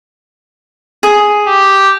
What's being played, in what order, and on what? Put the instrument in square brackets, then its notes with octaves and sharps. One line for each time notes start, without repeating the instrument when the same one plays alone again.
[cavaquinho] G#4
[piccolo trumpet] G4